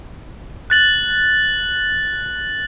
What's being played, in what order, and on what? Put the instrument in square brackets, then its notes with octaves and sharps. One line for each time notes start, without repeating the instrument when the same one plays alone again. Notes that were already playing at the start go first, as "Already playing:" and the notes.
[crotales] F#6 A6 F#7